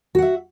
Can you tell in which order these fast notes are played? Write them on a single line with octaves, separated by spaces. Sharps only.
F#4 F#5 E5